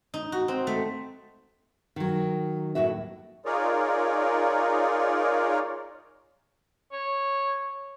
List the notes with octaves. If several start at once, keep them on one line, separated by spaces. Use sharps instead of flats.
D#4
F#4
C4
A3
D#3 F#3
D#2 A2 F#3 F#4 E5
D#4 F4 G#4 A#4 C#5 D5
C#5